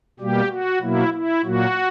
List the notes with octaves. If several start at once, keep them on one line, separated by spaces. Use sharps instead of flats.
B2 G3 A#3 G4
F#4
B2 F#3 A#3 E4
E4
A#2 F#3 A#3 F#4